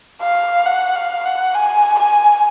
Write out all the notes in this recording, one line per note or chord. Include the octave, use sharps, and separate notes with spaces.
F5
F#5
F5
F#5
G#5
G#5